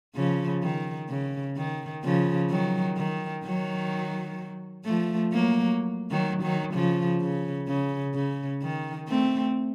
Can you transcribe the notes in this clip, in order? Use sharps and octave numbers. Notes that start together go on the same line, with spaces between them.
C#3 F3
D#3
C#3
D#3
C#3 F3
D#3 F#3
D#3
D#3 F#3
F3 A3
F#3 A#3
D#3 F#3
D#3 F#3
C#3 F3
C#3
C#3
C#3
D#3
A3 C4